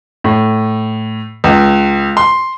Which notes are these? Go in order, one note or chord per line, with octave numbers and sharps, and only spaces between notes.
A2
C#2
C6